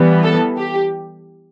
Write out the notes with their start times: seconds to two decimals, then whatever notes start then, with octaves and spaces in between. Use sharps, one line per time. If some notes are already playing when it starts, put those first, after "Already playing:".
Already playing: E3 G3 B3
0.23 A4
0.57 G4